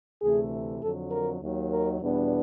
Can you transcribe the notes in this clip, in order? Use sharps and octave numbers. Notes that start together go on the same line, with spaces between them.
D2 C3 E3 A3 G#4
F2 D3 F#3 A4
A#4
D#2 D#3 F#3
A#4
E2 B2 G3 B3 D4